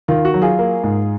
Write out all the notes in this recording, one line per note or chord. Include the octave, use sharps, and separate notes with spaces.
D#3 F4
F#4
F#3
F4 G#4
A#3
G#2